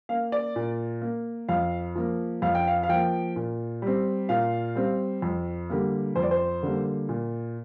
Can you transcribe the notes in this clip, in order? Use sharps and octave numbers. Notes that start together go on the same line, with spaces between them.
A#3 F5
D5
A#2
A#3
F2 F5
F3 A#3
F2 F5
G5
F5
F5
F3 A#3 G5
A#2
G3 C4
A#2 F5
G3 C4
F2
D3 G3 A#3
F2 C5
D5
C5
D3 G3 A#3
A#2